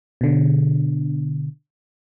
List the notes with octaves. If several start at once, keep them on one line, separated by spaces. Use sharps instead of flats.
B2 D3